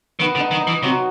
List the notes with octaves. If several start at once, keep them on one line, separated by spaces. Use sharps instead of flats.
D#3 B3
D3
D#4
D#3
D#4
E3
C3 F#3